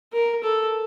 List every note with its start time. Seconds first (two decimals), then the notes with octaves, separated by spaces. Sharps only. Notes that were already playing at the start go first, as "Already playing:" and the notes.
0.13 A#4
0.44 A4